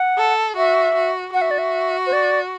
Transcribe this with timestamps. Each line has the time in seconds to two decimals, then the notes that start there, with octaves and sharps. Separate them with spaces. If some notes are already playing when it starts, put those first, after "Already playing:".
Already playing: F#5
0.18 A4
0.56 F#4 E5
0.95 F#4
1.34 F#4 F#5
1.42 E5
1.51 D5
1.58 E5
2.07 C5
2.13 D5